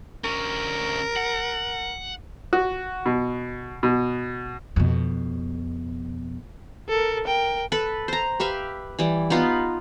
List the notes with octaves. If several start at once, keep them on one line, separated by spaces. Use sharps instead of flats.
D2 C#4 A#4
F#5
F#4
B2
B2
F2 B2
A4 A#4
A#4 G5
A4 B4
C5 A#5
G4 B4 E5 F5
E3 G3
B3 D#4 F4 B4